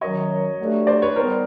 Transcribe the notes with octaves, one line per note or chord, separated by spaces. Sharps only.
F#2 D#3 F#3 C#5 D#5
G2 D3 F#3 A3
C5 D5
B4 C#5
G#2 D#3 G3 B3 A#4 C5